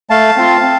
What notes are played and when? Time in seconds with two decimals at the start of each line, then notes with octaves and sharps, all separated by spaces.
0.10 A3 F5 A5
0.36 C4 F4
0.62 C4